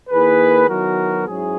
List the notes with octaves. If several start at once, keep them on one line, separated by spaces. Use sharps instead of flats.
D#3 A#3 E4 G#4 B4
D#3 F#3 B3 E4 F#4 A#4
G#2 F#3 C#4 E4 G#4